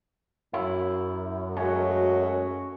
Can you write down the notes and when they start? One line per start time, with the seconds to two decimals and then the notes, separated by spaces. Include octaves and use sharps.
0.53 F#2 E4
1.56 G#3 A3 C#4 F#4